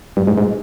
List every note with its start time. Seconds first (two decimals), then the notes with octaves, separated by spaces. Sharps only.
0.17 G2
0.27 G#2
0.38 G#2